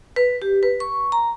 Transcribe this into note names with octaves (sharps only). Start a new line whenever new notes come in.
B4
G4
B4
C#6
A#5